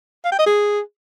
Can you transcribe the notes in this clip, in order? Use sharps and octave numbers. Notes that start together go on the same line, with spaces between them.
F5
G5
D#5
G#4